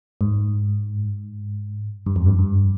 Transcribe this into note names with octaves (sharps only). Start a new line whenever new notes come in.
G#2
G2
F2
G2
G2